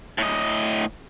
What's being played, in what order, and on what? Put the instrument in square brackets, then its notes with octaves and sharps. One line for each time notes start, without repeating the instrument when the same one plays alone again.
[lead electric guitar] A2 D#5